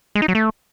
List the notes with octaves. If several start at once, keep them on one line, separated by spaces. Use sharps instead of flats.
G#3
D#4
F#3
A3